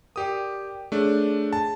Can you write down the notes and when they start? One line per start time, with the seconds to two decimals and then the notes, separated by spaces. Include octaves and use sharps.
0.16 G4 A#4 D5 G5 D#6
0.92 A3 D4 G#4 C#5
1.53 A5